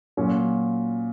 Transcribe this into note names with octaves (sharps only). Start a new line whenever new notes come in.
A#2 F#3 C#4